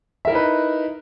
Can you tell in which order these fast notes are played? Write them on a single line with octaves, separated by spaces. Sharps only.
E5 A#4 E4 D#4 B4